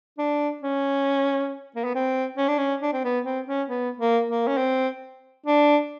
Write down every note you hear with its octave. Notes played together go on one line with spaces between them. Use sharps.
D4
C#4
A#3
B3
C4
C#4
D4
C#4
D4
C4
B3
C4
C#4
B3
A#3
A#3
C#4
C4
D4